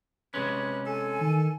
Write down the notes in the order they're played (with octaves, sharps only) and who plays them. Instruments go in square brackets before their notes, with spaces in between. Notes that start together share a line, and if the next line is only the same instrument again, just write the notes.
[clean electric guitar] C3 G#3 C#4 [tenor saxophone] B4
[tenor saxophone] A4 [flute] G#5
[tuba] D#3